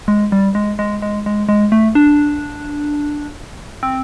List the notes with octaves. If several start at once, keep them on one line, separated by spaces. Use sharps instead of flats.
G#3
G3
G#3
G#3
G#3
G#3
G#3
A3
D4
C4